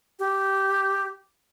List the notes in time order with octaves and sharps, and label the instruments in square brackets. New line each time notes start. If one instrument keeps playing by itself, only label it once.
[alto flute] G4